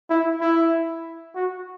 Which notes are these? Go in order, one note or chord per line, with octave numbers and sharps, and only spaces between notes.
E4
E4
F#4